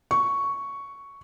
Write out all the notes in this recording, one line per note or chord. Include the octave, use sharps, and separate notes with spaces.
C#6